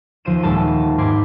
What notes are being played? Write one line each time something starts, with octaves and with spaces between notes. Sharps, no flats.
D#2 F3 C5 D#7 E7
D#1 D#2 G#3 A4 C5 A5
G#2 C4 B4 C6 D6 G#6